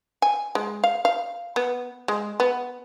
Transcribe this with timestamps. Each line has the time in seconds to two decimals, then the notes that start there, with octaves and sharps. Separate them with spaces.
0.22 G#5
0.55 G#3
0.84 F5
1.05 F5
1.56 B3
2.08 G#3
2.40 B3